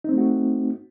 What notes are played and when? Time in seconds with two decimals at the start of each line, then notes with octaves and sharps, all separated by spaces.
0.04 D#4
0.09 C4
0.13 A3
0.18 F#4